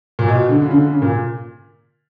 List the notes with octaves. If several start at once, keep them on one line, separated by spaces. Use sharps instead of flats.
A#2
B2
D3
C#3
D3
C#3
A#2